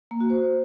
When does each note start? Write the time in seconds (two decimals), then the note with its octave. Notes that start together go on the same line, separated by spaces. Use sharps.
0.11 A#3
0.20 F#4
0.30 C5